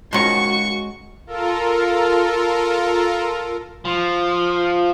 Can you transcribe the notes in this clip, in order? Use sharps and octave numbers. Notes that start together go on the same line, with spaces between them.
D#3 F3 G#3 C#4 F#4 C#6
F4 A4 A#4
F3